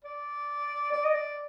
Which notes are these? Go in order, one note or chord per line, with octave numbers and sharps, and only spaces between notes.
D5
D5
D#5
D5